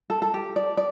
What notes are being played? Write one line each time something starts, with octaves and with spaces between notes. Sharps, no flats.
A4
A4
G4
D5
D5